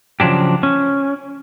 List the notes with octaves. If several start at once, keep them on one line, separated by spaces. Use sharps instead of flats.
C#3 F3 F#3 D4 G4
C#4